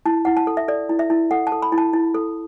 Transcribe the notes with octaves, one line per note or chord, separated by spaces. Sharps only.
E4 A5
E4 F#5
A5
A4
E5
A4 D5
E4
E5
E4
A4 F#5
A5
A4
B5
E4
A5
E4
A4